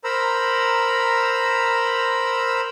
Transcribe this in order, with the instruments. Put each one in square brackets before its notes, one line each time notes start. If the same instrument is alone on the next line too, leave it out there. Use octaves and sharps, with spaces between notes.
[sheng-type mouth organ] A#4 C5 A#5 B5 E6